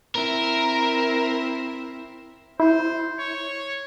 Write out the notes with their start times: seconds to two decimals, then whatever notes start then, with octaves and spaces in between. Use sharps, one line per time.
0.15 C4 E4 A#4
2.60 E4 C5
3.19 C#5